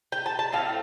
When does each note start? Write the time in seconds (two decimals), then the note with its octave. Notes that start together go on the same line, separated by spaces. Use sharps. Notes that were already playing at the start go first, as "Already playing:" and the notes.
0.12 G5
0.26 A5
0.39 A5
0.52 A2 A3 C4 F5